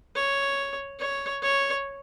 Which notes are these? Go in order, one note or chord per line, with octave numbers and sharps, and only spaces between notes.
C#5
C#5
C#5